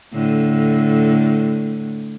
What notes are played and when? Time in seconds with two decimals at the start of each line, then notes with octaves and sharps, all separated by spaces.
0.13 A2 D3